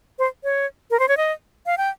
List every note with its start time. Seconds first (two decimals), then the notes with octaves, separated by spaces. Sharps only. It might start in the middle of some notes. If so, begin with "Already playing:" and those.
0.19 C5
0.44 C#5
0.91 A#4
0.99 C5
1.08 C#5
1.17 D#5
1.66 F5
1.78 G5